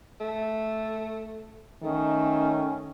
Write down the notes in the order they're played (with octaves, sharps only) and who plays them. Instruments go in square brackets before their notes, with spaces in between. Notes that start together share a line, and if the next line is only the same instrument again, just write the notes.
[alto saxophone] A3
[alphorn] D#3 [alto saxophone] A3 [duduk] C#4